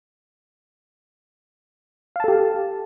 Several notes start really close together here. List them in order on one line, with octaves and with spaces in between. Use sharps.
F5 A5 A4 G4